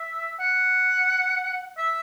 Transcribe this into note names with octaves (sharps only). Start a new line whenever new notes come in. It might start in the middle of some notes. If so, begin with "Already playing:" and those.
Already playing: E5
F#5
E5